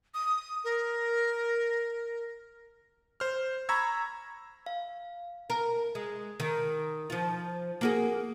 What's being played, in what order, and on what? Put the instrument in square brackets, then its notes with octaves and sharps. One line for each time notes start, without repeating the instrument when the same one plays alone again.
[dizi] D#6
A#4
[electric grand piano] C5 F6
A#5 B5 C#6 E6 G#6
[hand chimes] F5
[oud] A#4
G#3
D#3
F3 F4
A#3 F#4 G#4